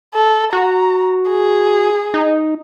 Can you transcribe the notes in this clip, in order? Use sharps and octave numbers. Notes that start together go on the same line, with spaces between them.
A4
F#4 A#5
G#4
D#4